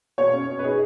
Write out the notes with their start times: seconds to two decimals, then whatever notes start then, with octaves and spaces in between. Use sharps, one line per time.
0.18 B2 C#5
0.33 C#4
0.49 B2
0.59 B4
0.64 D#4 G#4